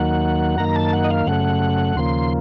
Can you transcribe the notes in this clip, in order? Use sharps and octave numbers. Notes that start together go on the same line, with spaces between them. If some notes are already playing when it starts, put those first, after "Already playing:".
Already playing: D#2 D#3 F#3 A#3 F#5
F#2 D#3 A#3 A#5
A5
F#5
D#5
F5
F#2 C#3 A3 F#5
D#2 C#3 F3 A#3 C6